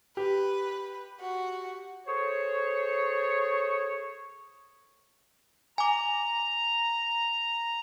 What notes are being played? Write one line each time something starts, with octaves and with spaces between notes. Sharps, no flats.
G4 B4
F#4
G#4 A4 C5 C#5
G#5 A#5 D6